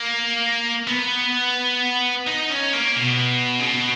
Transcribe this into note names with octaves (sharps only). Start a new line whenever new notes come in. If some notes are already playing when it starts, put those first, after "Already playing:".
Already playing: A#3
B3
D#4
C#4
A#3
B2
C#3
B2